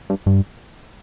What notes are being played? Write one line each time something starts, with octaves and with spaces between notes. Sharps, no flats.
G2
G2